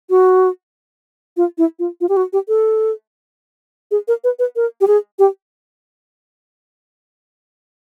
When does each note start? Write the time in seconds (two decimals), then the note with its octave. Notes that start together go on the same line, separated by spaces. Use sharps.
0.10 F#4
1.37 F4
1.58 E4
1.79 F4
2.01 F4
2.09 G4
2.17 F#4
2.33 G4
2.48 A4
3.91 G#4
4.08 A#4
4.24 B4
4.39 B4
4.56 A#4
4.81 G4
4.87 G#4
5.19 G4